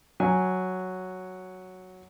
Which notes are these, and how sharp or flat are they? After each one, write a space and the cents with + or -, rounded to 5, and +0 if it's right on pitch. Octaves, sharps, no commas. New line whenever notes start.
F#3 +0 G#5 +0